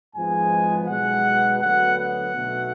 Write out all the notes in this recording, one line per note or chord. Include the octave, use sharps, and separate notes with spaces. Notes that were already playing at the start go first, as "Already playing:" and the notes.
G#1 G#2 F3 G#3 B3 G#5
B1 B2 G#3 B3 F#5
D2 D3 F#3 B3 F#5
F#5
B1 B2 A3